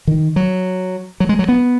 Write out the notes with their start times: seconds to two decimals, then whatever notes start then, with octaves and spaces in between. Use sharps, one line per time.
0.07 D#3
0.36 F#3
1.20 F#3
1.29 G#3
1.39 F#3
1.49 B3